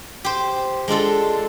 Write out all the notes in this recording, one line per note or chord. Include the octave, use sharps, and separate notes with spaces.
G4 C5
G#3 D4 F4 A4